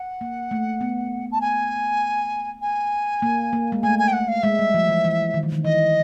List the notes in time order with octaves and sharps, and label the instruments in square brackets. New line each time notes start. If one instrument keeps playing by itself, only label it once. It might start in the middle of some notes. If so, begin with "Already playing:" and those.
Already playing: [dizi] F#5
[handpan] A#3
A3
B3
[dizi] A5
G#5
G#5
[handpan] A#3
A#3
G#3
[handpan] A3 [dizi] G#5
[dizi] G#5
G5
F#5
F5
[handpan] G#3 [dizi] E5
[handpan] G3
F3
E3
E3
D#3
E3
D#3
[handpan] E3 [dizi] D#5